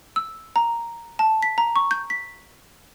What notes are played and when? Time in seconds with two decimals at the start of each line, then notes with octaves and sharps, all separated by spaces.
0.16 E6
0.56 A#5
1.19 A5
1.43 B6
1.58 A#5
1.76 C#6
1.91 G6
2.10 B6